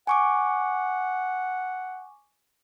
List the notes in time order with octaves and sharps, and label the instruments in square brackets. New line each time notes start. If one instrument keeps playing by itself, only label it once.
[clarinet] F#5 [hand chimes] G#5 C#6 D6